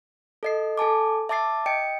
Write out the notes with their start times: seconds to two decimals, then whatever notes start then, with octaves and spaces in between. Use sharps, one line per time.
0.43 A4 D#5 C7
0.78 A4 G#5 A5 D6
1.29 E5 A5 D6 A6 C7
1.66 D#5 G5 C#7 D7